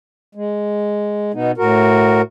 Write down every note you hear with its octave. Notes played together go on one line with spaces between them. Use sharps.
G#3
B2 B3 D#4
A2 F#4 A#4